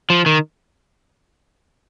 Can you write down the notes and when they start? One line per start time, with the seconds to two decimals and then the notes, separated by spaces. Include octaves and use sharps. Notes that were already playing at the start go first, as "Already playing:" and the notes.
0.10 F3
0.26 D#3